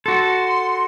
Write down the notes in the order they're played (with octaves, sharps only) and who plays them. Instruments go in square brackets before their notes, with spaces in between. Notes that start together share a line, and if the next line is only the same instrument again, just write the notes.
[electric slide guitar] F#4 A4 [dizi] C6